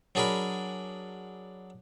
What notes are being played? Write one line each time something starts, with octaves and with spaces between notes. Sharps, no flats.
F#3 D4 G#4 A#4 B5